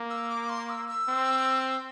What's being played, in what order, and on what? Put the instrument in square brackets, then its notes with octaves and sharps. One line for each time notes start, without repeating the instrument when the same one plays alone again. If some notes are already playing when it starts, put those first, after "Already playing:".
Already playing: [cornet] A#3
[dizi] E6
D6
C6
E6
E6
[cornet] C4